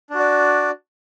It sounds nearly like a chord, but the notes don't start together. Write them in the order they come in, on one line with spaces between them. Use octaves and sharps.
D4 F#4 D5